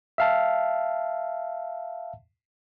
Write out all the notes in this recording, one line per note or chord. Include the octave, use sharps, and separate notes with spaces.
E5 F5 A5